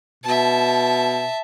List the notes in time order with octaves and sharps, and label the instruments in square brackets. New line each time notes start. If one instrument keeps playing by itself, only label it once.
[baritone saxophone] B2 [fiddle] E5 A5